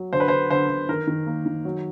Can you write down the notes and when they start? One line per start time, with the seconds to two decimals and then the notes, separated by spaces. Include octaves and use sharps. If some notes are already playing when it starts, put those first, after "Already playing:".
Already playing: F#3
0.13 D3 C5
0.20 B4
0.28 D3 C5
0.50 D3 C5
0.70 D3
0.89 D#3 A#4
1.07 D#3
1.26 A#3
1.46 D#3
1.65 F#3